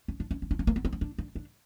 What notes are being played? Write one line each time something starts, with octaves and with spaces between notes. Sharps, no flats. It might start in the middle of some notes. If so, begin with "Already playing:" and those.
C#4
D4
C#4
C#4
D4
C#4
A#3
B3
C4
C#4
D4
D4
D4